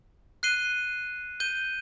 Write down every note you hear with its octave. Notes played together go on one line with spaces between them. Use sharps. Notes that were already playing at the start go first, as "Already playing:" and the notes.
F#6 C7 D#7 G7
G6 D#7 G7